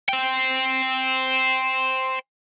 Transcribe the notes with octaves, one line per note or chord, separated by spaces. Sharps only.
C5 G5